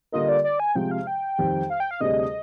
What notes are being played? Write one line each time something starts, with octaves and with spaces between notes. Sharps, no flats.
D3 G3 A#3 F4 A#4 D#5
D5
D5
G#5
C3 F3 G#3 G5
F5
G5
F2 D#3 G3 C4 G4
F5
G5
F5
D2 C3 G3 D4 G#4 D#5